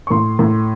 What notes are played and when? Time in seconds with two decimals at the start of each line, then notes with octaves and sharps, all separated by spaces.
0.07 C#6
0.10 A2 C6
0.39 A2